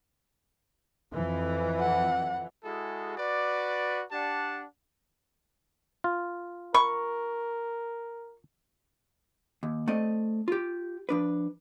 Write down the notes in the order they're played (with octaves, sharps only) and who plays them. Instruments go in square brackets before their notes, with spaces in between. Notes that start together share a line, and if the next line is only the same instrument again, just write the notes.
[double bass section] F2 E3
[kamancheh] F#5
[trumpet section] G#3 E4 F#4 G#4 A4
F#4 B4 D5
D4 G4 D5 F#5 A5
[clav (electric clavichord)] F4
[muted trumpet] A#4 [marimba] B5 [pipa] C#6
[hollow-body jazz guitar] D#2
A3 C4 D5 D#5
F4 G4
F3 D4 B4